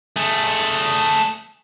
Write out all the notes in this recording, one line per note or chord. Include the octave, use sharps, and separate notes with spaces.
A3 G#4